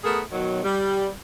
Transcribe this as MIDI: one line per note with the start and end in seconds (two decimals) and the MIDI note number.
0.04 0.21 57
0.04 0.21 59
0.04 0.21 68
0.04 0.21 70
0.32 0.62 47
0.32 0.62 51
0.32 0.62 54
0.64 1.09 55